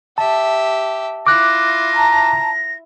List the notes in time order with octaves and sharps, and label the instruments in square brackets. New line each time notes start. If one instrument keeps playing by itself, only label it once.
[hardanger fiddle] G4 E5 [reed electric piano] A5
[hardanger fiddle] E4 F4 [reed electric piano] D6 F#6 [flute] A#6
[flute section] A5 A#5